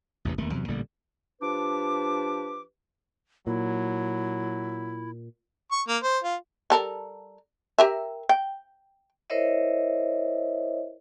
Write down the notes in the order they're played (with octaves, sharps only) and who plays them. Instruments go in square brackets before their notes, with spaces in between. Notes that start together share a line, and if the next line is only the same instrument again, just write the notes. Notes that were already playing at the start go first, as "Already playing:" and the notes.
[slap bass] A1 E2 C3 E3
E1 D#2 D#3 A3
E2 G2 C3 F#3
A1 A#2 D3 G3
[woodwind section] F3 D4 G4 B4 D6
[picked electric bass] A#2 [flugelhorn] F#3 [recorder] E4
[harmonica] C#6
A#3
C5
F4
[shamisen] G3 A4 A#4
G4 A#4 E5
G5
[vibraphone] E4 A#4 C5 C#5 D#5 E5